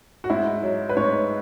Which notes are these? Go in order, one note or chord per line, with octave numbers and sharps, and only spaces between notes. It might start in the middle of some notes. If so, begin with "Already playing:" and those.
F#4
G#2 E4
F#3
B4
G#2 C#5